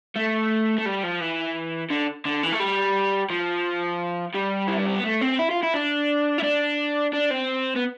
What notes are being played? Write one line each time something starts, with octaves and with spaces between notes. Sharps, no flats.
A3
A3
G3
F3
E3
D3
D3
E3
A3
G3
F3
G3
E4
D4
C4
B3
A3
C4
E4
F4
E4
D4
E4
D4
D4
C4
B3